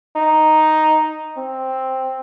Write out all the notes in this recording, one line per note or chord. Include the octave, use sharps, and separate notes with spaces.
D#4
C4